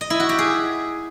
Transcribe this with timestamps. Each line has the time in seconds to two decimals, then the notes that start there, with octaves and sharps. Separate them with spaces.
0.01 D#5
0.10 E4
0.20 F#4
0.29 G4
0.39 G#4